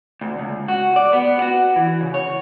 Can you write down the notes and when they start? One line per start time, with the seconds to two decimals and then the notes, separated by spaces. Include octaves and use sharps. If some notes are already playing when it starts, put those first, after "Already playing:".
0.21 D2
0.38 C#2
0.68 F#4
0.96 D5
1.13 B3
1.42 F#4
1.76 E3
2.01 C#3
2.14 C#5